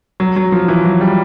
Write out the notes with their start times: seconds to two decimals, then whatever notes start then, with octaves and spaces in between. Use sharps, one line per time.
0.20 F#3
0.36 F#3
0.52 F3
0.68 E3
0.85 F#3
1.01 G3